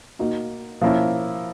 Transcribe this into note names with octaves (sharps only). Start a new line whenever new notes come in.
A#3 D#4 F#4
F3 A#3 C#4 E4